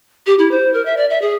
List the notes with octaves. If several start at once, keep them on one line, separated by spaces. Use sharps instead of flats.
G4
E4
C5
A#4
E5
D5
E5
G#4